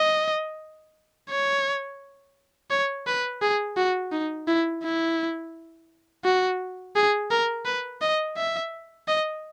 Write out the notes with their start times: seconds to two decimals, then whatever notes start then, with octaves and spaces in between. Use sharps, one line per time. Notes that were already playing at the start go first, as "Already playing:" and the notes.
Already playing: D#5
1.29 C#5
2.70 C#5
3.07 B4
3.42 G#4
3.77 F#4
4.12 D#4
4.48 E4
4.83 E4
6.24 F#4
6.95 G#4
7.31 A#4
7.65 B4
8.01 D#5
8.37 E5
9.08 D#5